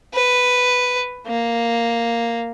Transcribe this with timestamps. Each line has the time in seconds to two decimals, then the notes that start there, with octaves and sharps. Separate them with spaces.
0.14 B4
1.27 A#3